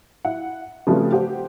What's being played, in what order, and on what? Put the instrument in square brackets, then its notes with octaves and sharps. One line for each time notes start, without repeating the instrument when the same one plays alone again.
[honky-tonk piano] E4 F#5
C#3 F3 G3 A3 C4 B4
G4 C5 F#5